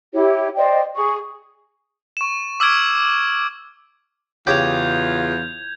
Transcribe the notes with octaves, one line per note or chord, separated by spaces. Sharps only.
E4 G4 C#5
C5 D5 D#5 G5
G#4 C#6
C#6 E7
D6 E6 F6 G#6 D7
E2 C#3 F4 G4 G5 G6 G#6 F7